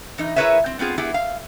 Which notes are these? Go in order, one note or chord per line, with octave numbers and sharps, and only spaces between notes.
E3 D#4
E4 G#4 A#4 B4 C#5 E5
C4
B3 C4 F4 G#4
B3 E4 G4 G#4
F5